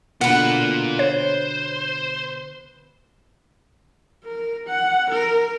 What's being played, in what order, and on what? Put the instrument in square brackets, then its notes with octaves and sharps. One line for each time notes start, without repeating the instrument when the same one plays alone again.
[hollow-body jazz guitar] B2 D3 [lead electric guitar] A#3 F4 [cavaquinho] B4 F#5
[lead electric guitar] C5 [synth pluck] C#5
[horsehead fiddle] A#4
F#5
A#4